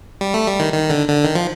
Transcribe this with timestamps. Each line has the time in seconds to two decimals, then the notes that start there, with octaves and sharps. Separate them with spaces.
0.21 G3
0.34 A3
0.47 G3
0.60 D#3
0.73 D#3
0.90 D3
1.08 D3
1.25 D#3
1.35 F3